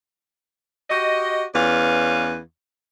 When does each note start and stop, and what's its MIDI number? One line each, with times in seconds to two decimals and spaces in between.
0.90 1.43 66
0.90 1.43 67
0.90 1.43 75
1.54 2.38 40
1.54 2.38 61
1.54 2.38 71
1.54 2.38 74
1.54 2.38 77